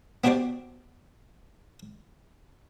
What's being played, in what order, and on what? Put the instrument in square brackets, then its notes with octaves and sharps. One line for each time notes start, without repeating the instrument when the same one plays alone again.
[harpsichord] B3 D4 F#4 G4 C5 D5